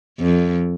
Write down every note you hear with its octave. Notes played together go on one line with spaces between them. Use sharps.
F2